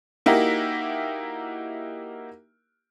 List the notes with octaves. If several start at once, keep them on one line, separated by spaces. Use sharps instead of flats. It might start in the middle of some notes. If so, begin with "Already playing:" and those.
A#3 D#4 E4 F#4 G4 A#4